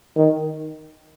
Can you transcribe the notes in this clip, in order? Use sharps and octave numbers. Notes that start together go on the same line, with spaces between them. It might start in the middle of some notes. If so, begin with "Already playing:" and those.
D#3